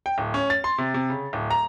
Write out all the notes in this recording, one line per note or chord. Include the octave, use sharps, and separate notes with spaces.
G5
D1
C#4
A6
C6
C3
C3
C#3
D1
A#5